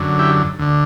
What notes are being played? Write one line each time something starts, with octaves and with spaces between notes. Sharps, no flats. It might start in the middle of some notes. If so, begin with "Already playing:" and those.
Already playing: F#2 D3
E4 G4
D2 D3